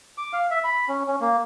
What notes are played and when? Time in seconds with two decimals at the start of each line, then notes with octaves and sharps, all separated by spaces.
0.18 D6
0.33 F5
0.51 E5
0.64 B5
0.88 C#4
1.08 C#4
1.21 A#3